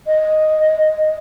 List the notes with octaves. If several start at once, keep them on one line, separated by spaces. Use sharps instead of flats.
D#5